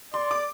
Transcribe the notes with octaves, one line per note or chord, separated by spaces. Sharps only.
D5 C6
D6